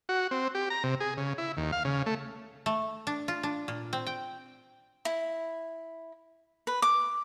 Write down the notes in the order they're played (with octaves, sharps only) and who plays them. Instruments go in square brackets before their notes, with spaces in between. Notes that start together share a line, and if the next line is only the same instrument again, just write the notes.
[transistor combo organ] F#4
C4
G4
A#5
C3
G#4
C#3
E4
D#2
F5
C#3
A3
[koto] A3
D4
F4
D4
A#2
C4
G5
[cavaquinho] E4
B4
D6